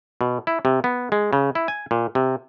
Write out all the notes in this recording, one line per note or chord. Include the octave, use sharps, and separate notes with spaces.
B2
E4
C3
B3
G#3
C#3
E4
G#5
A#2
C3